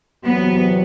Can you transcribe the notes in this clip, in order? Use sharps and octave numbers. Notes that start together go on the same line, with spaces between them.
E2 C3 F#3 B3